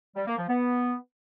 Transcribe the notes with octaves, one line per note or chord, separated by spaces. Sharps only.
G3
A#3
F3
B3